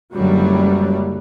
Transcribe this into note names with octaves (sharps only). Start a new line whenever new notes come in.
F#1 C#2 F#2 D3 F#3 G3